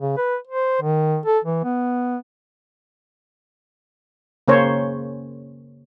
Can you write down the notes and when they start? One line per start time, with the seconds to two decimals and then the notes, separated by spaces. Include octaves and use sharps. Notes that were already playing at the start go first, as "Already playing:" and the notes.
0.01 C#3
0.17 B4
0.47 C5
0.82 D#3
1.26 A4
1.45 E3
1.64 B3
4.48 C#3 A#3 C#4 C5 C#5